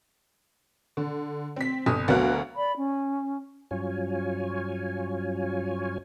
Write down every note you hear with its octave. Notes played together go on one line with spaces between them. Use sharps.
D3
C4 B6
G1 C3 D#6
D2 F#3 B3 A#4 F5 F#6
D5 B5
C#4
G2 F#3 C#4 F4 C#5 G#5